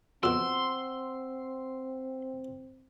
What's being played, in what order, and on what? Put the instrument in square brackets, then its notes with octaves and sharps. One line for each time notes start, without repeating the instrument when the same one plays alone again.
[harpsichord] F2 B2 [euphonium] C4 [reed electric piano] F#5 E6 [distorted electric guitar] C6